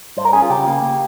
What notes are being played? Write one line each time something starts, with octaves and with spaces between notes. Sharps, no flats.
G2 C5
A#4
C#4 G#4
F4
C#3 G4
A#3
A#3